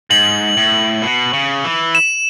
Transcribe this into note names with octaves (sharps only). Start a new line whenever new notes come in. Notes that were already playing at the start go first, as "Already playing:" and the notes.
G#2 F#7
A2
B2
C#3
E3
E7